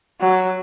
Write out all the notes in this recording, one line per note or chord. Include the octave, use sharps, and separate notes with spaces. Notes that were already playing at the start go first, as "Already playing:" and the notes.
F#3